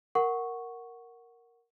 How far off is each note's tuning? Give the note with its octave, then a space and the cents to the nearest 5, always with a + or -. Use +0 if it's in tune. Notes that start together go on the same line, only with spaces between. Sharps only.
A#4 +0 F#5 +0 C#6 +0